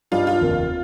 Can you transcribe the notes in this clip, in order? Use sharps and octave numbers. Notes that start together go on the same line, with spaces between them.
G2 G3 D#4 F4
F4
F1 D#2 D#3 A#3